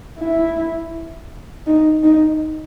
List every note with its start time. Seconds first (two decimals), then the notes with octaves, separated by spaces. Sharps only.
0.18 E4
1.66 D#4
2.03 D#4